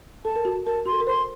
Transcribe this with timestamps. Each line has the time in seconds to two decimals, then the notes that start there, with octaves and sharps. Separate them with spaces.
0.25 A4 A5
0.36 A#4
0.45 F#4
0.66 A#4 A5
0.86 F#4 C6
0.92 A4
1.00 A#4
1.07 C5 C6